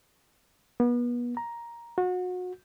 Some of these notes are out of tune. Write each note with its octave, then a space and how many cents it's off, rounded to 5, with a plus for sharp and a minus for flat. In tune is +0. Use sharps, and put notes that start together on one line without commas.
B3 -30
A#5 +10
F#4 -30